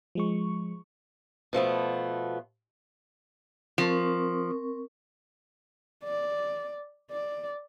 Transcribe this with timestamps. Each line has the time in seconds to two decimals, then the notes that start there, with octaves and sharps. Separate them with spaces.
0.15 F3 G#3 C#6
1.53 B2 F3 A3 B3
3.78 F3 C4 A#4 C#6
6.04 D5
7.10 D5